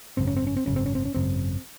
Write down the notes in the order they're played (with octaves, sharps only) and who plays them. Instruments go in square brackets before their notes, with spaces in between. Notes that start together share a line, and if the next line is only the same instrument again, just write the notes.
[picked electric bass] G#1 F#2 C#3 C4
C#4
C4
C#4
C4
G#1 F#2 C#3 C#4
C4
C#4
C4
C#4
G#1 F#2 C#3 C4